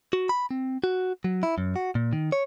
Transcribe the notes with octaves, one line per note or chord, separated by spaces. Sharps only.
F#4
B5
C4
F#4
F#3
E4
F#2
F#4
A#2
D#3
C#5